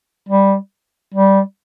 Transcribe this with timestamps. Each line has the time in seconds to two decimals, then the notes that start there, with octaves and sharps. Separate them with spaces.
0.29 G3
1.14 G3